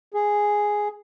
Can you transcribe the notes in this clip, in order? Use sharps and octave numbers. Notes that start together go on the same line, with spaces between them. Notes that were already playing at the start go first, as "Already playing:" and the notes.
G#4